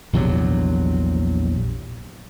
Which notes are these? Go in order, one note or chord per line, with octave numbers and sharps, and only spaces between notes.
A#1 E2 C3 F#3